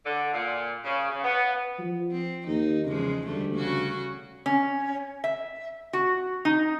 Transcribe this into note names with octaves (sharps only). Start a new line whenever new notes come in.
D3
A#2
C#3
C#3
B3
F3
C4
D#2 D#4
E2 C#3 F3 G#3
D2 G3 A3
C#3 C#4 F#4
C#4
E5
F#4
D#4